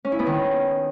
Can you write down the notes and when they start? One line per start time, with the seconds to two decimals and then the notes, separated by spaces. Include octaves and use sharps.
0.05 C#4
0.12 E4
0.19 B3
0.26 D#3